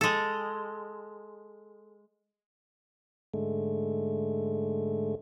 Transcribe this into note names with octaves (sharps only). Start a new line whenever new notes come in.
G#3 A4
G#2 D3 G#3 A3